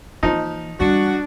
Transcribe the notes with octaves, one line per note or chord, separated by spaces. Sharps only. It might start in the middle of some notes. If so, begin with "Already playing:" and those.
E3 F3 A#3 D#4
E3 G3 D4 F#4